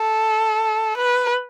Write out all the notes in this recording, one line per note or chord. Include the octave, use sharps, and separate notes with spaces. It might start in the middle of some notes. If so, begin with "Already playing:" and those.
Already playing: A4
B4